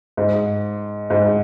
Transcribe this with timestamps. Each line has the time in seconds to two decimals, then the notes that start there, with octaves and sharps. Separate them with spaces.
0.17 G#2
1.10 G#2